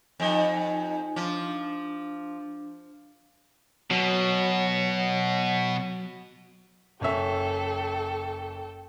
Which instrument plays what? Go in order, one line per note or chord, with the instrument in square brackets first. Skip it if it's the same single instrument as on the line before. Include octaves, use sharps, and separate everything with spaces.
[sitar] F2 [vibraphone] D#4 G#5
[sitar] F3 [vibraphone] D4
[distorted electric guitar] B2 [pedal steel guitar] F#3
[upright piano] F#1 C#4 E5 [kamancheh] A4 G5